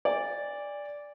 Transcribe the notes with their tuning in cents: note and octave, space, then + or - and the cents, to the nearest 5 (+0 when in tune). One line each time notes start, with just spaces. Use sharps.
D5 -10 G#5 -35